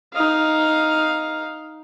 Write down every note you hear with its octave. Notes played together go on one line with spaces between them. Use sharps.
D#4 F5